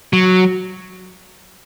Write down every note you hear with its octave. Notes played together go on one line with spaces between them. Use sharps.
F#3